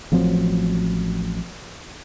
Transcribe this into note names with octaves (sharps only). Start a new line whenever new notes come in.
A1 F3 F#3 C4